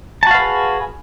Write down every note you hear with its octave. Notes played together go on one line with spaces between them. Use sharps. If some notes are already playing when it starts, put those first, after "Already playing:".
F#4 G#4 B4 F5 A5